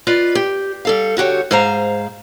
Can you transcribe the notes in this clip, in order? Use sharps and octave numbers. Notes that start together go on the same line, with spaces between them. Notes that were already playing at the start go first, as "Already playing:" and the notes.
F4 B4 D5 D#5
G4
G3 A4 F5
D3 F#4 G4 C#5
G#2 G#4 C5 F5 A#5